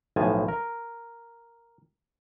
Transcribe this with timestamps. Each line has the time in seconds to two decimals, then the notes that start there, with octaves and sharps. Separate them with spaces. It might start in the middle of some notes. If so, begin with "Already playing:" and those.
0.16 B1 A2 F3 G#5 A5
0.48 A#4